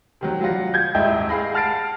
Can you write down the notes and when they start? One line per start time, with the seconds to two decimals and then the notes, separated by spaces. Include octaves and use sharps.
0.21 C3 D#3 F#3
0.41 F#3 G3 F4 F#5 A#6
0.74 G6 G#6
0.95 D#1 G#2 E4 D#5 E5 G5
1.29 G#4 F5 B5 A#6
1.53 F#5 A5 F6 A6 C7 D7